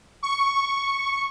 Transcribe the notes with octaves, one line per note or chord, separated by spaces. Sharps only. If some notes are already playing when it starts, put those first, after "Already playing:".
C#6